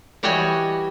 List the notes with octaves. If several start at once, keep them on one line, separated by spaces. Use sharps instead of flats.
E3 G3 F#4 C#5 D#5 G#5